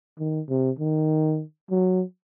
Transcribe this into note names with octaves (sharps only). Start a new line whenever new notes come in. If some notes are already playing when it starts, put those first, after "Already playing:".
D#3
C3
D#3
F#3